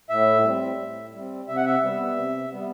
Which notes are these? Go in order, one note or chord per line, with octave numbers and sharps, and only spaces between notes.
A2 E5
G3 C4
A2
G3 C4
C3 E5
F#5
E5
G3 B3
C3
G3 B3